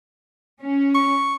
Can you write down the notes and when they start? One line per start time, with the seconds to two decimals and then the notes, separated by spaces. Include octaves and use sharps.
0.60 C#4
0.95 C#6